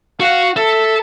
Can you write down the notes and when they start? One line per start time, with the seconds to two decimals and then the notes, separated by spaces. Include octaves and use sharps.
0.20 F#4 F5 F#5
0.56 A4 E5